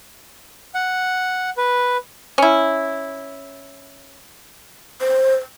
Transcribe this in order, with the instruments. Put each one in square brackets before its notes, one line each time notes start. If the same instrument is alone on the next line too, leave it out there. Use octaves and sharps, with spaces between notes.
[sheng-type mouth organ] F#5
B4
[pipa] C#4 E4
[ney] C5